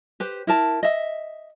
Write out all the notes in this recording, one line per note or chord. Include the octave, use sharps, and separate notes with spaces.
G4 B4 C5
E4 A#4 A5
D#5 E5